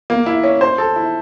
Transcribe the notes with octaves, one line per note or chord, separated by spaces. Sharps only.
A#3
E4
C#4
C5
A4
E4